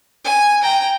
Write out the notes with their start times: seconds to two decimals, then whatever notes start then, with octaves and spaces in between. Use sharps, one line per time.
0.25 G#5
0.61 G5 A#5